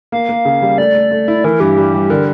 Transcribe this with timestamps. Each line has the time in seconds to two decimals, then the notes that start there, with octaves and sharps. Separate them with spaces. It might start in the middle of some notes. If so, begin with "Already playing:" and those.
0.12 A#3 F5
0.29 A#3
0.45 C#3
0.62 G3
0.78 A3 D5
0.95 A3
1.11 A3
1.28 E4
1.44 E3 A#4
1.60 G2 G4
1.78 G3
1.94 G3
2.10 D3 A#4